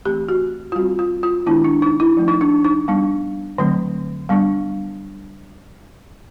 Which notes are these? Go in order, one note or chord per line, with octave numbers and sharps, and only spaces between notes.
E3 A3 C4 G4
F#4
F4
G3 C4 F#4
F4
F4
D#3 G#3 B3 D4 E4
D4
D#4
E4
F3 A3 C#4
D#4
D4
D#4
G3 B3 D4
D3 F#3 A3 C4
G3 B3 D4